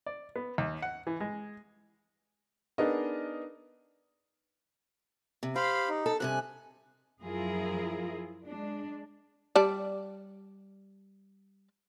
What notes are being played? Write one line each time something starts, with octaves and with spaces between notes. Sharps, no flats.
D5
B3
D#2
F#5
E3
G#3
B3 D4 D#4 G#4 A#4 D#5
C3
G4 C5 F5 B5
D#4
A4
G2 C3 G#5 F#6
F#2 F3 E4 F4 G#4 A#4
G#3 D4
G3 D5 A5